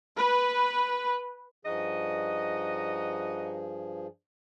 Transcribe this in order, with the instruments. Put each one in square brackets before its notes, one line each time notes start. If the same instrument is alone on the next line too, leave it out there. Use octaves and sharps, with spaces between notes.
[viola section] B4
[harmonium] G2 F3 G#4 [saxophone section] D#4 F#4 D#5